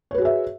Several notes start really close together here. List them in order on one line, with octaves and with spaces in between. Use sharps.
C#5 B4 F#4 G#4 E5